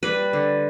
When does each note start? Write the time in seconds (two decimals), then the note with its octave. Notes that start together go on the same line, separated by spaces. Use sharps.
0.03 G3 B4
0.33 D3